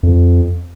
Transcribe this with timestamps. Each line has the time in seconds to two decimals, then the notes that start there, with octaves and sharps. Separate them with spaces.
0.03 F2